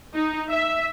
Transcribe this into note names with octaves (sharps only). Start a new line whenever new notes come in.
D#4
E5